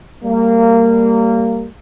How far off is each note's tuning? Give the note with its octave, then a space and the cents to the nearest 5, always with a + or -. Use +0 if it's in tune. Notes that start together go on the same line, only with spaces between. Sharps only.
G3 +0 A#3 -20